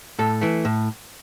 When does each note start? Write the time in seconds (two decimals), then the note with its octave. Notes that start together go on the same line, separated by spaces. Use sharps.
0.19 A2 A4
0.42 E3 A3
0.65 A2